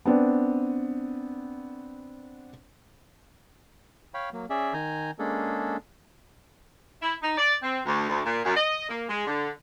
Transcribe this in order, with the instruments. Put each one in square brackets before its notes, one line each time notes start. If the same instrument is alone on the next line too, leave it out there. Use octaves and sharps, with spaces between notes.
[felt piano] B3 C4 D4
[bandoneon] C#5 F5 G5 B5
F#3 A#3
C#4 G#4 D5 E5
D#3 G#5 A#5 G6
G#3 A#3 C#4 D4 G#4 A4
[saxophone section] E4
D#4
D5
C4
D2
D2
A#2
F#2
D#5
A#3
G#3
D3